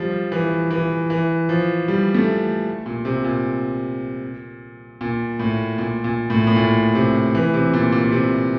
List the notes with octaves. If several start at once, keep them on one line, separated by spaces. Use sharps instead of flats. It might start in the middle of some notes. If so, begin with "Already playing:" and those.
Already playing: F3 G3
E3
E3
E3
F3
G3
A3
A#2
C3
A#2
A#2
A2
A#2
A#2
A2
A2
A#2
C3
E3
C3
A#2
A#2
C3